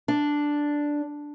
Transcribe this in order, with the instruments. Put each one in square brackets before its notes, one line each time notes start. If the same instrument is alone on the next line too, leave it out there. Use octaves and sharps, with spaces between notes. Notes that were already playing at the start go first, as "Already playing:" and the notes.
[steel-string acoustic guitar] D4